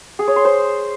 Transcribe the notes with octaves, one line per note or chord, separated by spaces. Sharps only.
G#4
C#5
C6
C5